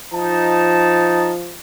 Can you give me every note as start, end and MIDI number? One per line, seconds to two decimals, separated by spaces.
0.13 1.58 53
0.13 1.32 63
0.13 1.32 81